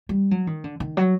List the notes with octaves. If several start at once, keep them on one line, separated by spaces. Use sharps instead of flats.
G3
F#3
D#3
D3
D#3
F#3